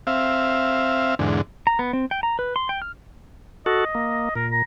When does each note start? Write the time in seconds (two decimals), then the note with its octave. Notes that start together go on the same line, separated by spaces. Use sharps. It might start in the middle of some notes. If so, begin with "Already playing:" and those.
0.07 C4 E5 F5
1.19 E2 G#2 D3
1.67 A#5
1.79 B3
1.93 C4
2.11 G5
2.23 A#5
2.39 B4
2.56 C6
2.69 G5
2.82 F6
3.66 F#4 A4 D#5
3.95 A#3
4.36 A#2 A#4
4.52 A#5